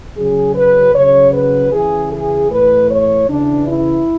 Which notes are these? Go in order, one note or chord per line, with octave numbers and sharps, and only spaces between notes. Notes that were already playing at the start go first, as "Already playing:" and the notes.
C#3 F#3 G#4
B4
C#3 F#3 C#5
B4
C#3 E3 G#4
G#4
A2 E3 B4
C#5
C#3 E3 D4
E4